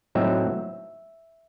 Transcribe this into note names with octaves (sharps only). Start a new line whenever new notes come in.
A2 F#3 C4 D#4 E5